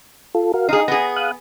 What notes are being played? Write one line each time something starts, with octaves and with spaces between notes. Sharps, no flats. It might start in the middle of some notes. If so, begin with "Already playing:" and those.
F4 A4
F#4 A#4 F5
D#4 G#4 F5 C6
B3 G#4 A#5
F5 D#6 F#6